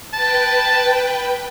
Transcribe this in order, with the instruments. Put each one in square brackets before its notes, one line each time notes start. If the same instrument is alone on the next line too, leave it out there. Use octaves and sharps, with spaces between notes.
[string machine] B4 G5 [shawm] A5